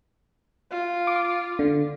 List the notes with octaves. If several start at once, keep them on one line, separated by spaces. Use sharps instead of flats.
F4
D6
D3